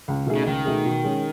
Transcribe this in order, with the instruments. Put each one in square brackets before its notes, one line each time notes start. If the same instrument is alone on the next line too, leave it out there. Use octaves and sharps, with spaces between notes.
[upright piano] C#2
B2 A3 D#4 G#4
[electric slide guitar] C#3
[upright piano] C#2 [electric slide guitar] D#3
[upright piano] B2 A3 D#4 G#4
B2
G#3 C#4 G#4